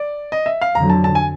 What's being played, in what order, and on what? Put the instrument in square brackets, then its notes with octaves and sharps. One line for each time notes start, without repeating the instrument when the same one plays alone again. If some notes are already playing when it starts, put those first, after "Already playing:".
Already playing: [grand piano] D5
D#5
E5
F5
[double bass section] F2 D3 F#3 [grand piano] A#5
[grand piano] A5
A5
G#5